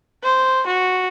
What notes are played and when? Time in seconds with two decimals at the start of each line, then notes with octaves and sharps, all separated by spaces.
0.24 C5
0.67 F#4